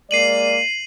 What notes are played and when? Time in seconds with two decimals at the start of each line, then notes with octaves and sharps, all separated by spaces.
0.11 G#3 A#3 D5 C7 D#7 F#7